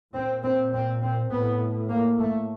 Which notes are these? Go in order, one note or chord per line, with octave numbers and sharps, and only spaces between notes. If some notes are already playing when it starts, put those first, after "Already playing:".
A#2 C4
C4
C4
C4
A2 B3
A#3
A3